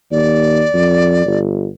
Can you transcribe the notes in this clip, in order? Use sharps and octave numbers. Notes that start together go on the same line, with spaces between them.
D#2 D5
F2
G1